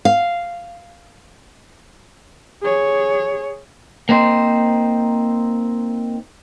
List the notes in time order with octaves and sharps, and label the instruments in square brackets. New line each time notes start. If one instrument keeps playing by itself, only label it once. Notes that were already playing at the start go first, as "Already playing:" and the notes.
[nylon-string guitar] F5
[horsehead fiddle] G#4 C#5
[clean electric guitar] A#3 C4 D#4 C5